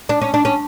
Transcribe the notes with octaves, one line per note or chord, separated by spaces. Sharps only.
D4
C#4
D4
C#4